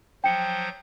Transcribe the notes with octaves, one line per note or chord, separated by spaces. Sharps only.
F3 F#3 C5 G5 C#7